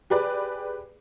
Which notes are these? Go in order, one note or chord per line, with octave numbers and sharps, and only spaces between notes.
G4 G#4 B4 D5